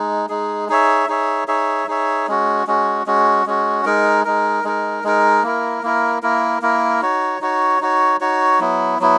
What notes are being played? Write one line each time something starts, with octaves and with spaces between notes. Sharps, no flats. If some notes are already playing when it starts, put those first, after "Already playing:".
Already playing: G#3 D#4
G#3 D#4 G#4
D#4 G#4 C#5 E5
D#4 G#4 C#5 E5
D#4 G#4 C#5 E5
D#4 G#4 C#5 E5
G#3 C#4 F#4
G#3 C#4 F#4
G#3 C#4 F#4
G#3 C#4 F#4
G#3 D#4 A#4
G#3 D#4 A#4
G#3 D#4 A#4
G#3 D#4 A#4
A#3 E4 A#4
A#3 E4 A#4
A#3 E4 A#4
A#3 E4 A#4
D#4 F#4 C#5
D#4 F#4 C#5
D#4 F#4 C#5
D#4 F#4 C#5
F#3 B3 E4
F#3 B3 E4